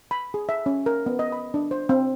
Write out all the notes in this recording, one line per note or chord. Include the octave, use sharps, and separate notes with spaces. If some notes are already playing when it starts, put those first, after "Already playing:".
B5
G#4
E5
C#4
A#4
B3
D#5
B5
D4
C5
C4